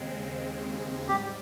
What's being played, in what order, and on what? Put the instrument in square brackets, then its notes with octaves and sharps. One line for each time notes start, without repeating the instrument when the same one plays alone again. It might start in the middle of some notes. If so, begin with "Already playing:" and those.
Already playing: [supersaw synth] D#2 C#3 G#3 C4
[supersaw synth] G#2 G3 [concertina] G4